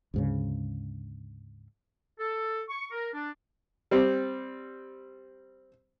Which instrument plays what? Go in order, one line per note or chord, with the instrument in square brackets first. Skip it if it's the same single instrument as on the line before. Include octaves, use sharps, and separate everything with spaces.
[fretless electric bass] D2 G#2 C#3
[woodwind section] A4
C#6
A#4
D4
[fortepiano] G3 C4